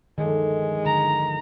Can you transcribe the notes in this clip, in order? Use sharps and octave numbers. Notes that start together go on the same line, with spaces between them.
D2 G2 D#3 F3 G#3
D3 A#5